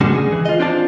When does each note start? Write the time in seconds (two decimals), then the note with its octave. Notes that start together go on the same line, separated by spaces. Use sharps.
0.01 C#3 G#3 C#4 D4 F#4
0.15 G#4
0.32 E3
0.45 F4 D#5
0.59 C4 D4 F4 D5 A5